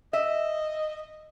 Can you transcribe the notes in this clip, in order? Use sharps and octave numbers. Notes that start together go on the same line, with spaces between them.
D#5 E5